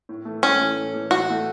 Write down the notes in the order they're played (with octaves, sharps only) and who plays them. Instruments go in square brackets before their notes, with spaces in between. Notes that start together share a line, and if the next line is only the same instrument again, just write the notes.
[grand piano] A2
E3 A3
[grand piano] A2 [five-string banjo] C#4
[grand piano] E3 A3
A2
E3 A3
[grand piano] A2 [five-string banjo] F#4
[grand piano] E3 A3